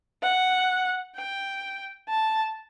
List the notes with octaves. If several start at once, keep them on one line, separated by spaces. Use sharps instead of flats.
F#5
G5
A5